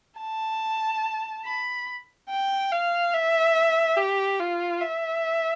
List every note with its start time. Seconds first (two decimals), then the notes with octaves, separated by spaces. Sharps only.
0.20 A5
1.45 B5
2.29 G5
2.72 F5
3.13 E5
3.97 G4
4.39 F4
4.81 E5